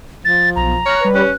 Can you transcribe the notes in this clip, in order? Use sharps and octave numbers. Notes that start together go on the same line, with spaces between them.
F3 A6
B1 A#5
C#5 F6 F#6 A#6
G3 B4
C#4 F#6